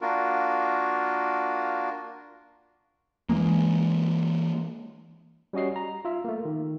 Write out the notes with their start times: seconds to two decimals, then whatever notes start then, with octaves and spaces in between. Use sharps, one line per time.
0.01 A#3 D4 F4 F#4 A#4
3.29 E3 F3 G#3 A#3
5.53 G3 C#4 F#4 D#5 C7
5.76 A#5
6.05 F4 E5
6.24 A3 A#3
6.45 D#3